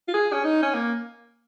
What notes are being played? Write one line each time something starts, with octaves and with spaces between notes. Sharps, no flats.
F4
G#4
C#4
D#4
C#4
A#3